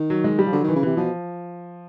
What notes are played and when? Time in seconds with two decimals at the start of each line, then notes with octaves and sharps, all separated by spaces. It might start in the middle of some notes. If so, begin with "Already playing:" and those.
Already playing: D#3
0.10 F#3
0.24 G#3
0.39 G3
0.47 F3
0.53 D3 F#3
0.64 D#3 E3
0.76 C#3
0.83 C3 E3
0.97 B2 F3